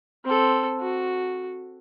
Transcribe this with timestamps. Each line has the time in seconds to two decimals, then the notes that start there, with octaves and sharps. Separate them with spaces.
0.25 C4 A4
0.80 F#4